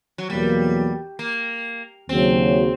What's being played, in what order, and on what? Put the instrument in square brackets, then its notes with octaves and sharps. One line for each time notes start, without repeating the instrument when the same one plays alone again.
[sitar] F#3
[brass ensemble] E2 B2 F#3 A#3 [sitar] G3
[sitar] A#3
[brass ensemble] D#2 C#3 F#3 [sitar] C4